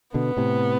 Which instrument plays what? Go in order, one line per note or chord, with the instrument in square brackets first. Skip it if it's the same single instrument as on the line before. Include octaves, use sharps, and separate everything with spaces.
[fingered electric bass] B2 D3 [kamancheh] B3
[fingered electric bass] A2 C3